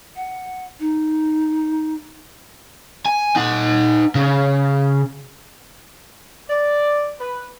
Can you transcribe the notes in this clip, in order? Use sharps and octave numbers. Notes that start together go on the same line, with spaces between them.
F#5
D#4
G#5
D#4 F#5
C#3
D5
B4